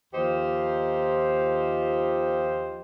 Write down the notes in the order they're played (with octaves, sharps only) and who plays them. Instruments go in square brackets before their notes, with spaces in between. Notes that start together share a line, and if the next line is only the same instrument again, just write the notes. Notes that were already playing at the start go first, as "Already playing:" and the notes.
[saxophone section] D#2 F3 D#4 F4 G4 C5